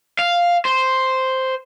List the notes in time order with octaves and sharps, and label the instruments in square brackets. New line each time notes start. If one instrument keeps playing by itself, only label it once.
[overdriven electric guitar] F5
C5